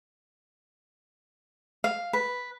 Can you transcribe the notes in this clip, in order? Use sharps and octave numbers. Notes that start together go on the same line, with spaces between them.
F5
B4